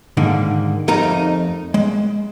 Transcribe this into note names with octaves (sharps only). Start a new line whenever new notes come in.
G#2 D3 D#3 A#3
F2 A3 D#4 A#4 A#5
G#3